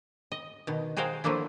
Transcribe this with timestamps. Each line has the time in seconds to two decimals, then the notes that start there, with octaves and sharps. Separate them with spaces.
0.32 D#5
0.67 B2 D#3
0.97 F#4 G#4 A#4 C5 F5 G5
1.24 F3 F#3 A3 A#3 D4 E4